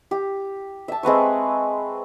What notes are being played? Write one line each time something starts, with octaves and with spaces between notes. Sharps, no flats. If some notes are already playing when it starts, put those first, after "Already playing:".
G4
E5 A5
G#3 C4 B4 C#6